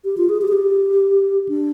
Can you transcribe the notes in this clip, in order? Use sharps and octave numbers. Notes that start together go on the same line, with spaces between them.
G4
F4
G#4
G4
G#4
G4
D4